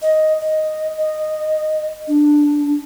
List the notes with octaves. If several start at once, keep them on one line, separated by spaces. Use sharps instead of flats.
D#5
D#5
D#5
D4